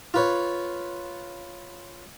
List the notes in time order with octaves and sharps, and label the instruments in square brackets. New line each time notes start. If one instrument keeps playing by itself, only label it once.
[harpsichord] F4 B4 C#5